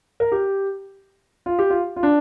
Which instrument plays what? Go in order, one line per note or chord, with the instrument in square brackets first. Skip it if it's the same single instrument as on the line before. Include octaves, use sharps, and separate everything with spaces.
[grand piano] A#4
G4
F4
G4
F4
F4
D4